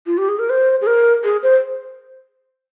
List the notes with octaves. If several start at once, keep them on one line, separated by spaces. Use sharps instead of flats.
F4
G4
G#4
A#4
C5
G#4
A#4
G#4
C5